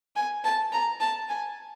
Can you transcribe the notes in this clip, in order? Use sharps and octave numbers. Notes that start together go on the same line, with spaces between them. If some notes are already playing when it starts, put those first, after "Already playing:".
G#5
A5
A#5
A5
G#5